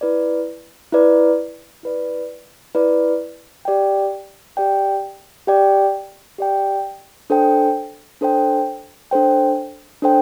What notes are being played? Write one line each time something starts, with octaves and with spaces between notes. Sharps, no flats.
E4 B4 D5
E4 B4 D5
E4 B4 D5
E4 B4 D5
G4 D5 G5
G4 D5 G5
G4 D5 G5
G4 D5 G5
D4 A4 C5 G5
D4 A4 C5 G5
D4 A4 C5 G5
D4 A4 C5 G5